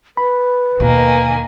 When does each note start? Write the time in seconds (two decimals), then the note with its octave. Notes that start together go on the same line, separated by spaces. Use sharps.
0.17 B4 B5
0.80 D#2 B2 D#3 A#3 G#5